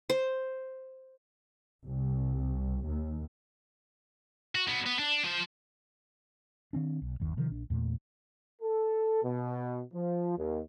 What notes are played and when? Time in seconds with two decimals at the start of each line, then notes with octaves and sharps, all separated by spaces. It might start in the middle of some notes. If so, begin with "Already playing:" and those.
0.10 C5
1.86 C2
2.87 D#2
4.55 F#4
4.68 F#3 B3
4.86 B3
4.99 D4
5.24 F3 C5
6.73 D#3 C4 D4
7.02 B1
7.20 G1 D#2
7.37 C3 D#3 F3
7.50 A#1 D4
7.70 E2 A#2 A3
8.62 A4
9.24 B2
9.93 F3
10.37 D#2